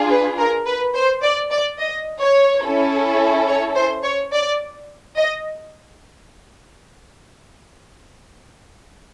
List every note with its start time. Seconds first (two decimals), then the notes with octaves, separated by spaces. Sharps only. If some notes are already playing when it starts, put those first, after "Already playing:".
Already playing: D4 F4 G#4
0.10 B4
0.38 A#4
0.66 B4
0.94 C5
1.23 D5
1.51 D5
1.79 D#5
2.21 C#5
2.64 C#4 E4 A4
3.48 C#5
3.76 C5
4.04 C#5
4.33 D5
5.17 D#5